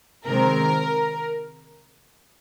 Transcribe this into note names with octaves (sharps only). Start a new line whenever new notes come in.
C3 D#3 G#3 C4 A#4